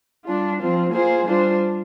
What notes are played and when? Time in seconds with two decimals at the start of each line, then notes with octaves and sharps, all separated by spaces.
0.25 G3 D4 F4
0.59 F3 C4 F4
0.93 A#3 F4 G#4 C5
1.27 G3 D4 F4 C5